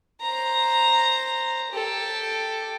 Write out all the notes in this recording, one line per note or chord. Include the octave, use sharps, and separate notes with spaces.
C5 A#5
G4 A4